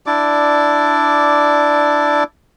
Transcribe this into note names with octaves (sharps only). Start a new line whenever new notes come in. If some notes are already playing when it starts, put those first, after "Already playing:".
D4 E4 D5 D6